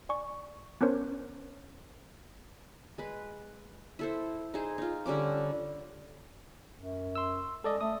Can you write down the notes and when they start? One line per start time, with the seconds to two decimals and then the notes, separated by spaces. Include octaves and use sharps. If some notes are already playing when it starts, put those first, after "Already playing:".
0.09 D5 G#5 C#6
0.81 B3 C#4 D4 A#4 C5 C#5
2.98 G#3 B4
3.99 E4 A4 C5
4.54 D#4 G#4 C5
4.78 D#4 F4
5.06 D3 G3 C#4 D6
6.76 F#2
7.15 C6 E6
7.64 G#3 A4 D5 D#5
7.81 A3 D#6